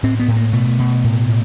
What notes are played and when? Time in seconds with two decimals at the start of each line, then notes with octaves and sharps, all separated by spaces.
0.03 A2 C4
0.20 B3
0.28 A2
0.36 A#3
0.53 B2 A3
0.79 B2
1.04 A2
1.29 A2